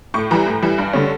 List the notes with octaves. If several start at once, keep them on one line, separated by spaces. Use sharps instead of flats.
A2 C#6
E3 G3 A#5
A2
E3 G3
G2
D3 G3 C#4